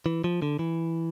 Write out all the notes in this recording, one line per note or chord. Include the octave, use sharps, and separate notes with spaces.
E3
F3
D3
E3